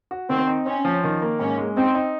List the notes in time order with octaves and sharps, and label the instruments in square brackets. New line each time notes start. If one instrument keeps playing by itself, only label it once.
[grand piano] F#4
[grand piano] D#3 [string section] C4
[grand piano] D#4
[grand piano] C4 [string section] C#4
[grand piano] F3
D#3
A#3
[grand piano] G#2 [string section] C#4
[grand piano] G#3
[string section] C4 [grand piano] D#4
[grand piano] D#4